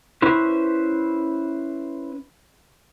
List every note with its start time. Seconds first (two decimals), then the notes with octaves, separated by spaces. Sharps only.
0.22 C#4 E4 B4 C5